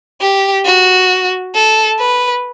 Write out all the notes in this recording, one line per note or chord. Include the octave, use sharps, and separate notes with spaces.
G4
F#4
A4
B4